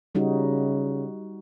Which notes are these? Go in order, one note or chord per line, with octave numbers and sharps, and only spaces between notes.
C#3 G3 D#4 F#4